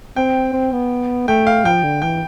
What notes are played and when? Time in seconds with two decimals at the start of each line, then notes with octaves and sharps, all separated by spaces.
0.16 C4 G5
0.53 C4
0.72 B3
1.28 A3 G5
1.47 F5
1.65 F3 G5
1.83 D3
2.02 E3 G5